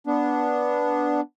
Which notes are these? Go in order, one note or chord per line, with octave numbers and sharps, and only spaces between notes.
B3 D4